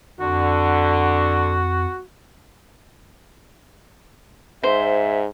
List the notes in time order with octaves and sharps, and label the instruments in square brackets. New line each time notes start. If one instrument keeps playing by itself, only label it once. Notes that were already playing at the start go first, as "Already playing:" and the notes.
[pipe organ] F2 [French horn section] D3 [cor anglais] F#4
[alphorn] G#2 [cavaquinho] C5 [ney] E5